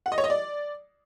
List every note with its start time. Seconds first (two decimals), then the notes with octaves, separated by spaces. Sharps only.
0.06 F#5
0.12 D#5
0.18 C#5
0.24 D#5
0.30 D5